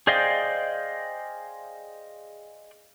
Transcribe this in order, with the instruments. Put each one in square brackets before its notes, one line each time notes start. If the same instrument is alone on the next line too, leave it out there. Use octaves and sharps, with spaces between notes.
[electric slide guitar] G#4 C5 D5 D#5 F5 G5